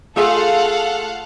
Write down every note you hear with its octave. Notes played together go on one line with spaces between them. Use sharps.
A3 F4 G#4 A4 F5 F#5